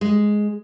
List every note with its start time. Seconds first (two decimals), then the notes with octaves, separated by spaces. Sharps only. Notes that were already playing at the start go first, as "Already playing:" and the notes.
0.01 G#3